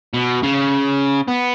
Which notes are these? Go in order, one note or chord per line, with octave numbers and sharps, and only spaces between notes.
B2
C#3
B3